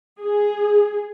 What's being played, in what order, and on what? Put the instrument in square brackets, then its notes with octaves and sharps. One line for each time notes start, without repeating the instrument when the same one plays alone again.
[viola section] G#4